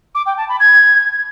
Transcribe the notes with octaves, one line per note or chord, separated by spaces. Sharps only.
D6
G5
A5
B5
G#6